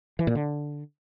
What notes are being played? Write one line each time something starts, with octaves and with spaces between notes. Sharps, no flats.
E3
A#2
D3